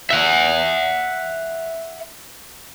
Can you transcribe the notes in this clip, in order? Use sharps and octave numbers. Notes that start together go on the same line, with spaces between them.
E5 F#5